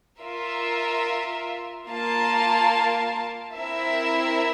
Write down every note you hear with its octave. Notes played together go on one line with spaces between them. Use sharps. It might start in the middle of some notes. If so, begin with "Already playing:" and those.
F4 A#4 E5
A#3 F4 A#4 F5 A5
C4 E4 A#4 E5